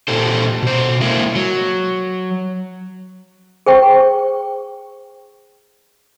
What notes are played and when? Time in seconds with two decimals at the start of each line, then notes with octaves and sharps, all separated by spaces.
0.08 A#2 G4 A4 C5
0.62 B2 C5
1.01 G#3 A#3 E4
1.35 F#3
3.66 G#4 C5 G5 C#6